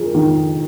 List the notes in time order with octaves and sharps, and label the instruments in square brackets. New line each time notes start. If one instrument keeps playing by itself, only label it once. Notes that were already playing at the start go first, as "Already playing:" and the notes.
Already playing: [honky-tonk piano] F2 G#4 A#4
D#3